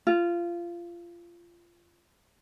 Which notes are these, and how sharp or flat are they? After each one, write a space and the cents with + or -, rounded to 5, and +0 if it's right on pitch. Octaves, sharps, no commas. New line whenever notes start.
F4 -20